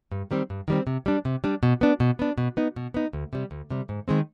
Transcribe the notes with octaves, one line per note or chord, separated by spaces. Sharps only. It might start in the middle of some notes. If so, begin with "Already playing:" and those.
G2
D#3 G3 C4
G2
D#3 G3 C4
C3
G3 D4
C3
G3 D4
B2
B3 D4
B2
B3 D4
B2
B3 D#4
B2
B3 D#4
D2
C3 G3
D2
C3 G3
G#2
D#3 G#3 C4